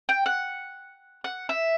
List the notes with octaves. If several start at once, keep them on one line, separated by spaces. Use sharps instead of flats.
G5
F#5
F#5
E5